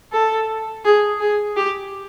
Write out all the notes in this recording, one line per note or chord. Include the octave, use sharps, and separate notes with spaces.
A4
G#4
G#4
G4